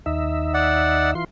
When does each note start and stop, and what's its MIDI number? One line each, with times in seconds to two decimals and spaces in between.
0.06 1.14 39
0.06 1.14 63
0.06 1.14 76
0.54 1.11 74
0.54 1.11 78
1.15 1.25 52
1.15 1.25 65
1.15 1.25 84